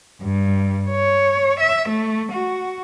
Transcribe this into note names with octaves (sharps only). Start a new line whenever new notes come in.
G2
C#5
E5
A3
F#4